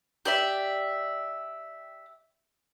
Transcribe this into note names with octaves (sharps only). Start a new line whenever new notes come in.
G4 D5 E5